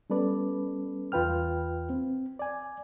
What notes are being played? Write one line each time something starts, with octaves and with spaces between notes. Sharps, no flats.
G3 B3 C#4 A4 B4 D5
E2 F4 B4 G5 F6
C4
D5 G#5